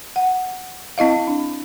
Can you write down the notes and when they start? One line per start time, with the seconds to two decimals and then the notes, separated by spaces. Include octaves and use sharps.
0.16 F#5
0.98 C4 E4 D#5 F5
1.27 D4